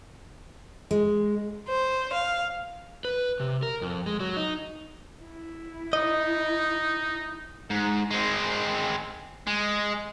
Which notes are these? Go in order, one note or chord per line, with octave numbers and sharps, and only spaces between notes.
G#3
C5
F5
B4
C3
A#4
F2
G#3
F#3
D#4
E4
D#4 D#5
G#2
G#3 C4
G#3